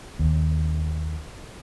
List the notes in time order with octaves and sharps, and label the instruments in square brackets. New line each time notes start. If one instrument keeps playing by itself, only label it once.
[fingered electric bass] D#2